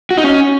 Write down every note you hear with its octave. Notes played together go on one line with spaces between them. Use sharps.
F#4
D#4
C#4